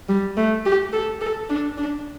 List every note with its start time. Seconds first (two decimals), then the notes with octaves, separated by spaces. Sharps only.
0.09 G3
0.37 A3
0.66 G4
0.93 A4
1.21 A4
1.49 D4
1.78 D4